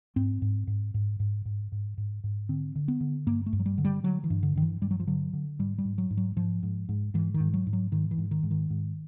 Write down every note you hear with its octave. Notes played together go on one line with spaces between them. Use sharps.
G#2 C4
G#2
G#2
G#2
G#2
G#2
G#2
G#2
G#2
D3 C4
D3
B3
D3
G2 A#3
A3
G2
F#3
G3
D3
G3
D3 F#3
E3
G2
D3
G2 D#3
E3
G2 G3
F#3
F3
D3 F#3
D3
G#2 G3
G3
G#2
F#3
G#2
F#3
G#2 F3
G#2
G#2
G#2 E3
D#3
G#2
F#3
G#2
F#3
G#2 D#3
E3
G#2
D#3
G#2
D#3
G#2